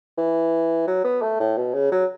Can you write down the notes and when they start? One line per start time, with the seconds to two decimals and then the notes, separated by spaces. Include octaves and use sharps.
0.18 E3
0.87 F#3
1.04 B3
1.22 A3
1.40 A2
1.57 B2
1.74 C#3
1.92 F#3